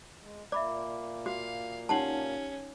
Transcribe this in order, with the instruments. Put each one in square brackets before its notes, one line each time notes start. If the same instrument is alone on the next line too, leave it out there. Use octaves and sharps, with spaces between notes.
[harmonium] G#3
[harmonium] A#2 A#3 [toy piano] D5 [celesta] E5 B5 D6
[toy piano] F#4 [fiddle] F5
[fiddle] C#4 [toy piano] D#4 F#5 A5 [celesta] G4 F#7